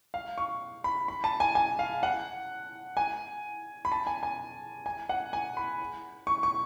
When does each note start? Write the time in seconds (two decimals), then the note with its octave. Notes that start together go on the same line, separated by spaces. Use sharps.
0.14 F5
0.38 C#6
0.84 B5
1.08 B5
1.24 A5
1.40 G#5
1.55 G#5
1.79 F5
2.03 F#5
2.97 G#5
3.85 B5
3.92 A5
4.07 G#5
4.23 G#5
4.86 G#5
5.09 F#5
5.33 G#5
5.57 B5
6.27 C#6
6.43 C#6